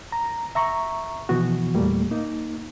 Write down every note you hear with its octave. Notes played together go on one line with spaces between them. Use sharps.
A#5
E5 A#5 C#6
B2 E3 F3 B3 F#4
E2 A#2 G3 A3 A#3
A#3 D#4